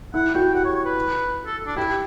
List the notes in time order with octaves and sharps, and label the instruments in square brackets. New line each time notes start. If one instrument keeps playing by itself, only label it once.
[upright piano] E4 [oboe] F#5
[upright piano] F#4 [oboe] G5
[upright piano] G4 [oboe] F#5
[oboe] C#5
C#5
B4
A4
D4
[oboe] E4 [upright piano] G4